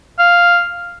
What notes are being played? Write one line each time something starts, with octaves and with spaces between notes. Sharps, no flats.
F5